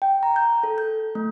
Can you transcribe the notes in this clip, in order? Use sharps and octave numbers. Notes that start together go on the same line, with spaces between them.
G5
A#5
G6
A4
G6
A3